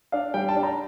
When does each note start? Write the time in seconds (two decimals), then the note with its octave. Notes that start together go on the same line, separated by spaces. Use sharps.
0.12 D4 F5
0.34 G3 G5
0.49 A5
0.56 D4
0.63 A#5